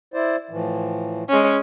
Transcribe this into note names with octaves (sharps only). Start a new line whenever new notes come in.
E4 C5 D5
A2 E3 F3
G#3 C#4